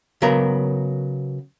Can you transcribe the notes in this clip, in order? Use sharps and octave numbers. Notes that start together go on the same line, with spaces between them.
C#3 F#3 B3 A#4 A#5